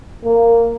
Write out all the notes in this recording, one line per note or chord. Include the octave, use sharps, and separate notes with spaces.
A#3